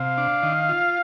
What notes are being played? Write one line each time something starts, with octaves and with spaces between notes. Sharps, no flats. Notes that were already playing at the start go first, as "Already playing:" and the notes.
Already playing: C3 F5
D4
D#3
F4